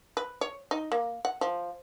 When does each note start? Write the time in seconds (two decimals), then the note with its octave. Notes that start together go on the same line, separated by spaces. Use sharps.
0.17 B4
0.41 C#5
0.71 D#4
0.92 A#3
1.25 F#5
1.41 F3